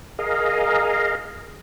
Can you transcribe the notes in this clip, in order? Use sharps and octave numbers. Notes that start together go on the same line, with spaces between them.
G#4 A#4 D#5 F5